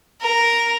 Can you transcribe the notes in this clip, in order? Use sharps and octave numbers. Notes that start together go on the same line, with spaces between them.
A#4